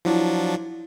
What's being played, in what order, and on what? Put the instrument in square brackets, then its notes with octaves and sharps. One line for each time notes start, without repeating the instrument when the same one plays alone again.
[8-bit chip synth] F3 F#3 D4 [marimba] E4